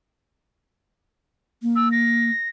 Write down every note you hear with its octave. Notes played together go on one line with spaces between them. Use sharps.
A#3
E6
A#6